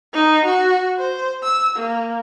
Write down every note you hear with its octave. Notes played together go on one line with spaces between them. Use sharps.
D#4
F#4
C5
E6
A#3